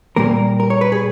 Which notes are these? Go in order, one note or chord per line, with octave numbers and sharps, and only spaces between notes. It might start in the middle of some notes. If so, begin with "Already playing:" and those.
A#2 G3 A#3 A#4
A#4
C#5
B4
G#4